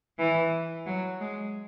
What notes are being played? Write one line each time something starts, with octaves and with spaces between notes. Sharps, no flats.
E3
F#3
G#3